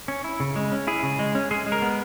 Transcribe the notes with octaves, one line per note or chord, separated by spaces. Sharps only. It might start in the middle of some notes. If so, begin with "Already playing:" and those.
C#4
E4
C#3
G#3
C#4
E4 G#4
C#3
G#3
C#4
G#3 G#4
G#3
A#4
B3